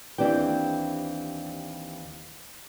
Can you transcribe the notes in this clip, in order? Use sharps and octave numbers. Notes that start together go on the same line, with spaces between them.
D#2 E3 C4 D4 G4 G5